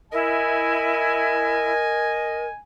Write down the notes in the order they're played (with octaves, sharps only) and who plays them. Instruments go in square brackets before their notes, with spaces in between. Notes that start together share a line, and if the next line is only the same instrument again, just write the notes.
[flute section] E4 [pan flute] A#4 [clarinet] D#5 [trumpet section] G#5